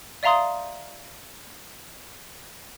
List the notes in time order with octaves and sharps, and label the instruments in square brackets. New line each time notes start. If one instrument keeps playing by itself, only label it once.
[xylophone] D5 E5 F5 A#5 C6 D#6